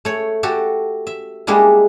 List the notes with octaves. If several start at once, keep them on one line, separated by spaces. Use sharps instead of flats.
A3 C#5
F#4 G4 A4
E5
G3 G#3 A#3 D4 E4